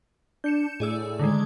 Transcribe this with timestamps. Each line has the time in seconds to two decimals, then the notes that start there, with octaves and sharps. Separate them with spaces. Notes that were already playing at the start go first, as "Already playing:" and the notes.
0.44 D4 G6 C#7 E7
0.80 A2 G#4 D5 E6
1.19 D3 D#3 G#3